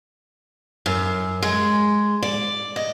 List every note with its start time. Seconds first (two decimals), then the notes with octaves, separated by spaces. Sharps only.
0.86 F#2
1.43 G#3
2.23 D5
2.76 D#5